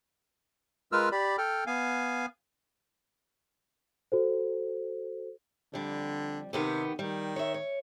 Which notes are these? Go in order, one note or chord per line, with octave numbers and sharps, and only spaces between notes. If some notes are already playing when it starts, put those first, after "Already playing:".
G#3 F4 A#4 B4 E6 F6
G4 D5 B5
A4 G5 F6
B3 F5 G#5
F#4 A4 C5
F2 D3 G3
C3 D#3 B3 G4
D#3 G3
C#5 E5
C#5